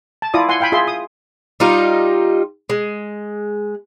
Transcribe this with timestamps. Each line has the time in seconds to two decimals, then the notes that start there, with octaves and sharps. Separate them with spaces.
0.22 A5
0.34 E4 F4 D5 D#6
0.49 F#5 G#5 C6
0.61 F5 G5 G#5 B5
0.72 F4 G#4 E5 C6
0.88 D#6
1.60 G3 D#4 F4
2.70 G#3